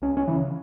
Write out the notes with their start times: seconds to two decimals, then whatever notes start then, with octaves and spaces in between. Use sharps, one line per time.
0.02 C#2 C#4
0.17 C#4
0.27 C#3 E3